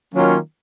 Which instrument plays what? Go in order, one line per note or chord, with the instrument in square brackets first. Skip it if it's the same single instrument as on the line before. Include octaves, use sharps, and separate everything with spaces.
[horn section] D#3 F#3 A#3 C#4 F4